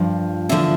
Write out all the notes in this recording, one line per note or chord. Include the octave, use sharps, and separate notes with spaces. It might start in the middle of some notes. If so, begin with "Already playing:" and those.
Already playing: G2 F3
E2 D3 F3 E5